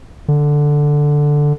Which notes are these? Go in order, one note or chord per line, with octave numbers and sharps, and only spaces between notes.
D3